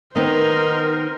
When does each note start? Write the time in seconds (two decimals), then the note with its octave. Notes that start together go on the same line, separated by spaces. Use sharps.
0.16 D#3 B3 C4 D#4 A#4 C5